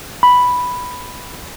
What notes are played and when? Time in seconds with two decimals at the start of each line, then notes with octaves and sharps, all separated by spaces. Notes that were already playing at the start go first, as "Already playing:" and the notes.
0.23 B5